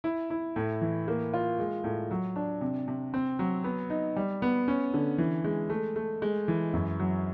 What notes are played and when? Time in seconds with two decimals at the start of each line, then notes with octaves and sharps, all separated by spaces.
0.04 E4
0.30 E4
0.56 A2
0.81 E3
1.08 A#3
1.34 F4
1.59 G#3
1.84 A2
2.11 F#3
2.36 D4
2.61 C3
2.88 C3
3.14 C4
3.39 F#3
3.64 B3
3.90 D#4
4.16 G3
4.42 B3
4.68 C#4
4.94 D3
5.18 E3
5.44 G#3
5.70 A3
5.96 A3
6.22 G#3
6.48 E3
6.73 F#2
7.00 F#3